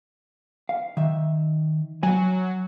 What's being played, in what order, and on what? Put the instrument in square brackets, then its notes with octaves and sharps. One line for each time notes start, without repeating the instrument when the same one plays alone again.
[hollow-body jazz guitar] F5
D#3 E5
[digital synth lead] F#3 [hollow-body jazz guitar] G#5